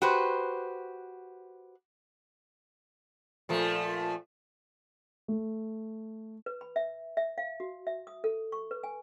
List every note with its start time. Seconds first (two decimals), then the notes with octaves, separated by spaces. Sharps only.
0.02 F#4 G4 B4 C5
3.49 A#2 F3 A3
5.28 A3
6.46 B4
6.61 B5
6.76 E5
7.17 E5
7.38 F5
7.60 F#4
7.87 E5
8.07 D#6
8.24 A4
8.52 C#6
8.71 B4
8.83 G#5